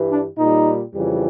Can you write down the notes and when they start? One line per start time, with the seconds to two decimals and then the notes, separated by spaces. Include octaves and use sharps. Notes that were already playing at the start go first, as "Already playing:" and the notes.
Already playing: G2 E3 G3
0.09 D4
0.37 A#2 G3 D#4
0.94 F2 C#3 E3 G3